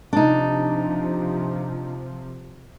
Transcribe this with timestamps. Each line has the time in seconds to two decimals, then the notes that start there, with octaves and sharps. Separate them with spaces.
0.13 C3 F3 D4 D#4